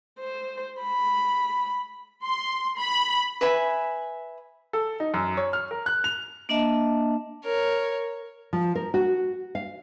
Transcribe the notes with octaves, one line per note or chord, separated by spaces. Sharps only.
C5
B5
C6
B5
B4 E5 G#5 B5
A4
D#4
F#2
C#5
F6
A#4
F#6
F7
A#3 D4 D#5 E5 A5
A#4 C#5
F3
A#4
F#4
F5